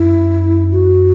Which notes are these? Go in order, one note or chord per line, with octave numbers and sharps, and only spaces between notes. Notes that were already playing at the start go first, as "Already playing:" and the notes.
Already playing: F#2 E4
F#4